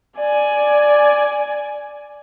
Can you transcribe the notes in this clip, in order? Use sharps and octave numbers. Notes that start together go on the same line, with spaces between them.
D5 G#5